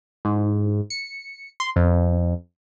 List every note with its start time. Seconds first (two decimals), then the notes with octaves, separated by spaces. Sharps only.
0.25 G#2
0.90 C#7
1.60 C6
1.76 F2